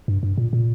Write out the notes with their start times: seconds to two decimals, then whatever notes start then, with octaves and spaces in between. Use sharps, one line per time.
0.08 G2
0.23 G2
0.38 A#2
0.53 A#2